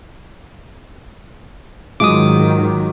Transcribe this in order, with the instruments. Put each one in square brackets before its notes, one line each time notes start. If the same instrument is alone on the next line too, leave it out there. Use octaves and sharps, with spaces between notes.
[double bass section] G#2 D#3 [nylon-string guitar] F#3 G#3 F4 [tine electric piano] D6 D#6